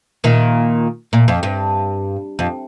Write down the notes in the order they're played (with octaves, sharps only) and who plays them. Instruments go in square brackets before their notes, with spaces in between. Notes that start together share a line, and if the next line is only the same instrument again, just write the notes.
[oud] A#2 D#3
A#2
F2
G2
F2